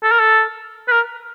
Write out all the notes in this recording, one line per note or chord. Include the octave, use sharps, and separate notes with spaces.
A4
A#4
A4
B4
A#4